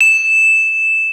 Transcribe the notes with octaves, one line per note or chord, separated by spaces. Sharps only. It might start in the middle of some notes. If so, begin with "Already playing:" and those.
E7